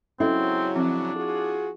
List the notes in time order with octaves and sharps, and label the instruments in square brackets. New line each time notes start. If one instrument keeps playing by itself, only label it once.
[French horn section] G#2 C#3 F#3 [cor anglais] C4 [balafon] C#4 A4 D#5 [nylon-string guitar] E4
[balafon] F3 C4 [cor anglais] D4
[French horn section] F4 F#4 G#4